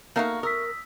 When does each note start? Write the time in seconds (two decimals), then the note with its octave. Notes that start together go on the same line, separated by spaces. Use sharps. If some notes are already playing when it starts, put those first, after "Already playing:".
0.16 A3 A#3 D#4 F#4 A#4 F5
0.43 A#4 D#6 E6 B6